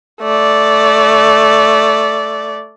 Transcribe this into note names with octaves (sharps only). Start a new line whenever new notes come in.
A3 D5